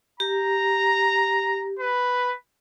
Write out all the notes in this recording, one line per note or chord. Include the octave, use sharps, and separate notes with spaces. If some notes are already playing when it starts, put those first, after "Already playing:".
G4 A#5
B4